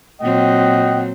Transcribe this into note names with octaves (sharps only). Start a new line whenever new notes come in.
A#2 F#3 C4 D#5 F#5 G5